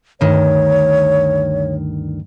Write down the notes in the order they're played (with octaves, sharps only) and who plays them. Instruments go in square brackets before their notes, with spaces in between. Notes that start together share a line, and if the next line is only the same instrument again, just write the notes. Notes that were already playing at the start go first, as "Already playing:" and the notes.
[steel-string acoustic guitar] D2 G2 D#3 [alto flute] C#5